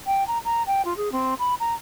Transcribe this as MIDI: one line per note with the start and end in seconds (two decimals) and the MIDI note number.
0.06 0.25 79
0.27 0.38 82
0.44 0.62 82
0.66 0.84 79
0.84 0.96 65
0.97 1.11 68
1.12 1.34 60
1.38 1.54 83
1.60 1.73 82